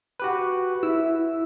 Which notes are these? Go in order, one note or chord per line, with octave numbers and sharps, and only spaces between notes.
F#4 G4 B4
E4 E6